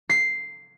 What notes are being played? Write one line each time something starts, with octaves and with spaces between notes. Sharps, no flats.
C7